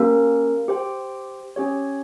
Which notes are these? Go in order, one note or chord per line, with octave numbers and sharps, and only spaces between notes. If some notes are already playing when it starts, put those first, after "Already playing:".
Already playing: A#3 C#4 G4 A#4
G4 C5 G5
C#4 G4 C#5